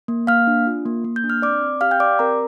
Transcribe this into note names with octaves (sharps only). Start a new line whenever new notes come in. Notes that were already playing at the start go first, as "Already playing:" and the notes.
A#3
A#3 F5 F6
D4
F4
A#3
A#3
G6
D4
F6
C4 D5 D6
C4
G4 F5 F6
G5 G6
G4 D5 D6
C4 A#4 A#5